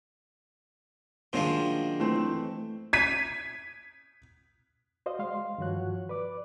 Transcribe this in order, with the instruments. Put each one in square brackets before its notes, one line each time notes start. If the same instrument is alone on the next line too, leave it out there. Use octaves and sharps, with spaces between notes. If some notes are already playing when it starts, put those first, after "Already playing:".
[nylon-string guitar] F#2 D4 F5 [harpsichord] A#2 D#3 G#3 [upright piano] C5
[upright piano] E3 C4 C5 [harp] A3
[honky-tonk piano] G#6 B6 D#7
[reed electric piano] F#4 C5 D5 D#5 F5
G#3 F5 C6
G2 D#3 F3 F#4 C#5 F#6
B4 D5 D6